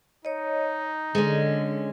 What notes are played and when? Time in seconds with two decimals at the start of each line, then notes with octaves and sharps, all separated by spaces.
0.25 D#4 C#5 D#5
1.15 D3 G#3 C#4 A4 D#5